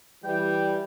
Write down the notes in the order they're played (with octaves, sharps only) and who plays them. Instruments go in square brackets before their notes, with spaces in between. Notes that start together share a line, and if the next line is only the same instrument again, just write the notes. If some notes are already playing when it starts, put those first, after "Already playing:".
[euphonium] E3 [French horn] G3 [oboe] G5